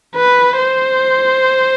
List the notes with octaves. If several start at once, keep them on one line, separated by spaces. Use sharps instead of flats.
B4
C5